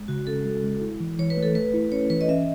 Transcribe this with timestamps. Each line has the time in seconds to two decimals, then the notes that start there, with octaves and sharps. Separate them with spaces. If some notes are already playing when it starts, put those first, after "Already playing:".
Already playing: G#3
0.08 C#3 F#4
0.27 C#4 A4
0.46 G#3
0.64 G#3
0.82 E4
1.00 E3
1.18 E3 C#5
1.30 B4
1.37 A3
1.42 A4
1.55 A3 B4
1.74 E4
1.92 C#4 C#5
2.10 E3 B4
2.21 D#5
2.29 C#4 E5